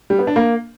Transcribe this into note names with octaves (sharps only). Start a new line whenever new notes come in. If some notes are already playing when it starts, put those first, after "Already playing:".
G3
B3
D4
A#3